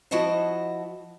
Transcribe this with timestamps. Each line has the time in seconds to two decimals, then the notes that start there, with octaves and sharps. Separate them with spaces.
0.11 F3 E4 F#4 D#5 F#5 A5